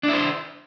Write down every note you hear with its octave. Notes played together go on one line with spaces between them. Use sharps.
D4 E4 C5